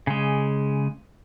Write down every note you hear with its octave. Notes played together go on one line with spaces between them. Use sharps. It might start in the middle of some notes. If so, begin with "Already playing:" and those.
C#3 G#3